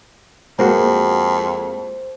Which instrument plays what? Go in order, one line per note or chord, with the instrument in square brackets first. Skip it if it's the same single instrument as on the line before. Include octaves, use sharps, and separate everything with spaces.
[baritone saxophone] F2 [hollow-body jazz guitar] G#3 A#3 F#4 [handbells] C5